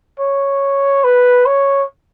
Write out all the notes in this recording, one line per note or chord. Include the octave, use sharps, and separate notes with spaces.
C#5
B4
C#5